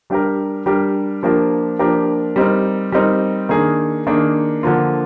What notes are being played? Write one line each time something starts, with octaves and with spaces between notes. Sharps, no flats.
G3 D4 G4 A#4
G3 D4 G4 A#4
F3 A#3 D4 G4 A#4
F3 A#3 D4 G4 A#4
G3 C4 D#4 A#4
G3 C4 D#4 A#4
D#3 A#3 D4 G#4
D#3 A#3 D4 G#4
D3 F3 A#3 F4